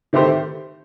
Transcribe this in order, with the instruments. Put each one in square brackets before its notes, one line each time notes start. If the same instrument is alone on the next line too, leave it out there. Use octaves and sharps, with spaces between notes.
[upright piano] D#3 A3 C4 G4 C5